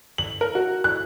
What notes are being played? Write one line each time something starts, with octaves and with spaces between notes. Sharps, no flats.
F#7
A#4
F#4
F#6